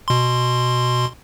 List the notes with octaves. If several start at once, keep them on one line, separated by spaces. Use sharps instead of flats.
B2 C6